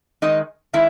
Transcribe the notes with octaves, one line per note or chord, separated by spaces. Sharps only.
D#3 G#3 D#4 D#5
D#3 G#3 E4 E5